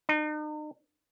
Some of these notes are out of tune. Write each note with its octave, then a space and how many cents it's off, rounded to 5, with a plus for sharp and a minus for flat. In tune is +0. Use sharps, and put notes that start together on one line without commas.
D#4 -40